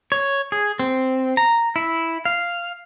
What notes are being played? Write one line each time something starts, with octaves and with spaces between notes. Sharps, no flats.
C#5
G#4
C4
A#5
E4
F5